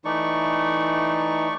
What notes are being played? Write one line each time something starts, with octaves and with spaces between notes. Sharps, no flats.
E3 A3 D#4 D5 C#6